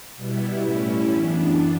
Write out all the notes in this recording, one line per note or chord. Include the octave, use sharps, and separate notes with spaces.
B2 G3 B3 E4
A2 G3 C#4 E4
F#2 E3 B3 D4